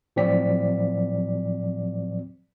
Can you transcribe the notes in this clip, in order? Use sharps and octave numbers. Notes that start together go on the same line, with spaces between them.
A2 F3 F#3 C4 D5 B6